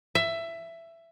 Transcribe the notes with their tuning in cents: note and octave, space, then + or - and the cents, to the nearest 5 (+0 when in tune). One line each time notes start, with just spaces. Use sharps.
E5 +15